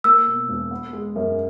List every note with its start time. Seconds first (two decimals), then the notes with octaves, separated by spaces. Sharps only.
0.04 A#3 E6
0.27 B2
0.49 E1
0.71 B3
0.93 G#3
1.16 F#2